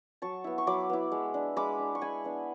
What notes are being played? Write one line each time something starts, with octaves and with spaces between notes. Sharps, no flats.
F#3 A5 C#6
B3 E4
C#6
F#3 B5 D6
B3 E4
G#3
D4
G#3 B5 D6
D4
C#6
G#3 G#5 B5
B3 D4